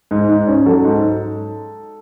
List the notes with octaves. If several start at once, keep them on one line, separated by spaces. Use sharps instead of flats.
G#2
G#2
C#4
F#3 A4
G#2